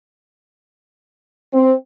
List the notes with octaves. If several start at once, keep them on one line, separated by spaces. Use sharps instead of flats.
C4